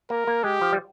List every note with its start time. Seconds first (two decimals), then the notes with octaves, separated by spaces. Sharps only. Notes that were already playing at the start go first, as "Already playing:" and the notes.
0.10 A#3 A#4
0.27 A#3
0.44 G#3 G4
0.61 F3
0.73 G3